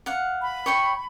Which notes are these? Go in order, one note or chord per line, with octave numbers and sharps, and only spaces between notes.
F5 F#5
B5
C#5 G5 C#6